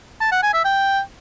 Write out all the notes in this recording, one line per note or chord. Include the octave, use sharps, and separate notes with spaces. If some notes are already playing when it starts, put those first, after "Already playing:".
A5
F#5
G#5
E5
G5